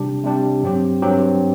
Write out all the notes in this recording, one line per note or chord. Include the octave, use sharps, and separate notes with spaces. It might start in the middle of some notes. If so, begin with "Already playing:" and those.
Already playing: C3 G3 D4 G4
C3 G3 D4 G4
G2 F#3 C4 G4
G2 F#3 C4 G4